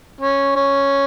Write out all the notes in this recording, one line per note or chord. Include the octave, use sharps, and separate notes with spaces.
C#4
C#4